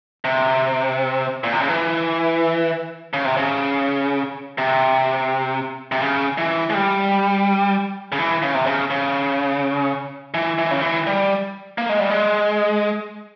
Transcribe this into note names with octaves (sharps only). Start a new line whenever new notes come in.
C3
A#2
C3
C#3
E3
C#3
C3
C#3
C3
C3
C#3
E3
G#3
G3
C#3
E3
C#3
C3
C#3
C#3
E3
E3
C#3
E3
G3
A#3
G#3
G3
G#3